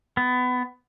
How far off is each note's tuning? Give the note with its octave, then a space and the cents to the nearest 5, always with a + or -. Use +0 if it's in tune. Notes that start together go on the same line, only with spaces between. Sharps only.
B3 +20